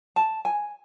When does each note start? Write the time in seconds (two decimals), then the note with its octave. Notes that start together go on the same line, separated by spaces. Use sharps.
0.16 A5
0.45 G#5